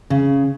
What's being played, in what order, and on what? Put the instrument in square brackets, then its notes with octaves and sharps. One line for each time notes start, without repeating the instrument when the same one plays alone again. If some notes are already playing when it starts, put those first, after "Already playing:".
[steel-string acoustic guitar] C#3